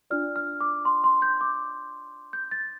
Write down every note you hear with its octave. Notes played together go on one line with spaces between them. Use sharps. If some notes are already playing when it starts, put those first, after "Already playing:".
D4 F4 D5 F6
F6
D6
C6
C6
G6
D6
G6
A6